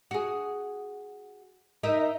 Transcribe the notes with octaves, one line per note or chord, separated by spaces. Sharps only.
F#4 G#4
D#4 A#4 E5